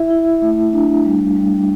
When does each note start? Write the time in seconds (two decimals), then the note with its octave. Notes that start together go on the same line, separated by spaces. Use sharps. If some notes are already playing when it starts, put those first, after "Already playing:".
Already playing: E4 E5
0.10 E4
0.42 A3
0.73 D4
1.05 G3
1.36 G3